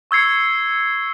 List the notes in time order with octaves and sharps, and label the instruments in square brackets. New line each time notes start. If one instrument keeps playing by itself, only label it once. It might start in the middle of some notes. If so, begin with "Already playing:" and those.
[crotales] C#6 E6 G#6 C7 C#7